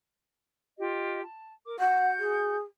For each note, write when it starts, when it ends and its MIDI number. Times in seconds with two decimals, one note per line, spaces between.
0.77 1.21 65
0.77 1.21 67
0.77 1.21 75
1.24 1.52 81
1.66 1.76 70
1.66 1.76 86
1.79 2.56 66
1.79 2.08 78
1.79 2.56 91
2.19 2.60 68